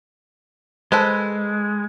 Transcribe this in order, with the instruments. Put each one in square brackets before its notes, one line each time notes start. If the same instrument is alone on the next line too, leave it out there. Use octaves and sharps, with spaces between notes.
[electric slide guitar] G#3 [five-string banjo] A4 B4 C5